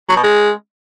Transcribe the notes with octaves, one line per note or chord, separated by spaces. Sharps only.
F#3
B2
G#3